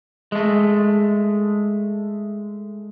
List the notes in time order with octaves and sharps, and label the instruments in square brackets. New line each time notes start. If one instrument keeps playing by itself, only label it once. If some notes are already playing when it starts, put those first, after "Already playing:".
[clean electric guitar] G#3 A3